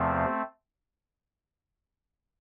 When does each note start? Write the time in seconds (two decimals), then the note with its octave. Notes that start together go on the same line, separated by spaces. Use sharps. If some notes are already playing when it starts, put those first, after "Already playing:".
Already playing: E2 C3 F3 A3 C4